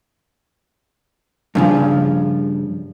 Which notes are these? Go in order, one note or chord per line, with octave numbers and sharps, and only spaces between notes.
G2 C#3 F3